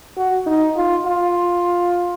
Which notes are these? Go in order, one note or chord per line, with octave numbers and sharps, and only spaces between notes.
F#4
D#4
F4
F4